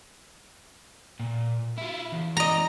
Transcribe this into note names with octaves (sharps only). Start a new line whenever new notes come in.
A#2
E4 F4
E2
D#5 A#5